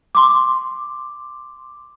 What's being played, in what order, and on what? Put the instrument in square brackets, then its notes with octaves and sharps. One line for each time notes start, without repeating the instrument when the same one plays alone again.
[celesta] C6 D6